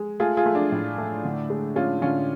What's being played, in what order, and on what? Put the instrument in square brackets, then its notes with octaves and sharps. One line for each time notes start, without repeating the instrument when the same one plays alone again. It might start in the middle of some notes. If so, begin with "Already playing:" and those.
Already playing: [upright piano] G#3
A3 F4 G#4
F4 G#4
A3
D4
A2
A3
D3
G#3
G#3 C#4 F4
D3 C#4 F4